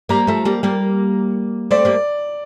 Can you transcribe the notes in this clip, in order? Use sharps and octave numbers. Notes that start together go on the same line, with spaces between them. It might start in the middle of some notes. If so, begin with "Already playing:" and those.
G3 A#3 A#5
F3 A3
G3 A#3
G3 A#3
A3 C4 D5
G3 A#3